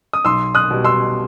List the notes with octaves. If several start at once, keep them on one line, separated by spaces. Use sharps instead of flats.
D#6
B1 C6 E6
D#6 F#6
B2 G3
C6 E6